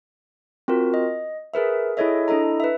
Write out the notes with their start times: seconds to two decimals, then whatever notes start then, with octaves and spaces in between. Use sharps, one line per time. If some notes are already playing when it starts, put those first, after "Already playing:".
0.68 C4 F4 F#4 A#4
0.94 D#5
1.54 G#4 A#4 B4 E5
1.97 E4 G#4 A4 C#5 D#5 E5
2.28 D4 E4 A4 D#5 A#5
2.60 B4 E5